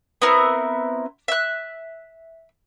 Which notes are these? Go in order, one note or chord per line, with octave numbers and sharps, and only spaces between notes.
B3 C4 E4 A#4
E5 F#6